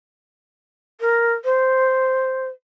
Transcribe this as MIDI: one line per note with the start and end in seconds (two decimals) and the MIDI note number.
1.00 1.33 70
1.44 2.47 72